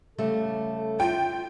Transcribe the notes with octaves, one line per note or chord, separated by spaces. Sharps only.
C#3 G3 A3 A4
F4 G5